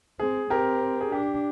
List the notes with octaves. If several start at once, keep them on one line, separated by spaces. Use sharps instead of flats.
C4 G#4
C4 G4 A#4
G#4
D4 G4